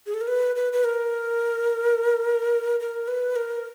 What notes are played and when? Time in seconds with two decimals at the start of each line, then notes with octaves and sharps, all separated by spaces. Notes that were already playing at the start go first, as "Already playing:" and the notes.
0.06 G#4
0.14 A4
0.21 A#4
0.27 B4
0.56 B4
0.73 B4
0.84 A#4
2.80 A#4
3.08 B4
3.36 A#4